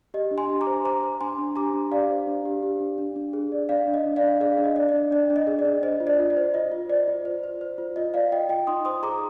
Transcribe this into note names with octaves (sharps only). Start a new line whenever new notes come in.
G4 D#5
D4
G#5 C6
G4
A#5 D6
C5
C5 A#5 D6
C5
D4 G#5 C6
D4
G4 A#5 D6
D4
G4 D5 F5
C5
D4
G4
G4
D4
D4
D4
G#4
D5
D4 D5 F5
D4
D#5
D4
D5 F5
D4
G#4 D5 F5
D4
D#5
D5
D4 D5
D4 D5
D4
D#5
G#4
D5
D4
C5 D#5
F4
D5
F4
D5
C5
F4 D#5
F4
C5 D5
F4
C5
C5
C5
F4
F4 D#5
F4 D5 F5
F4 D#5 G5
F4 D#5 G5
D#4 C6 D#6
C5 C6 D#6
G#4 A#5 D6